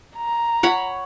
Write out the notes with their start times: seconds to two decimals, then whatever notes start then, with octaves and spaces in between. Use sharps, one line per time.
0.16 A#5
0.63 C#5 F#5 B5